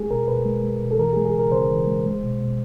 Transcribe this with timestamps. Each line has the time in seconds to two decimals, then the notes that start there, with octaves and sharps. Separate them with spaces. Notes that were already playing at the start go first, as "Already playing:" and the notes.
Already playing: G#3 G#4
0.10 B2 A#4
0.28 B2 B4
0.45 G#3
0.63 G#3
0.82 B2
0.91 A4
0.99 E3 A#4
1.13 G#4
1.17 G#3
1.26 G#4
1.34 C#3
1.39 A#4
1.52 C#3 C5
1.70 E3
1.87 G#3
2.06 G#3
2.23 B2
2.41 B2